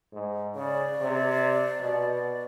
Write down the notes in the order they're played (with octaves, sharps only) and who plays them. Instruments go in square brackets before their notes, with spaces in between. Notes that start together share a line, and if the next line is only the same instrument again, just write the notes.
[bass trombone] G#2
[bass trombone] C#3 [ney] D5
[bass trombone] C3
B2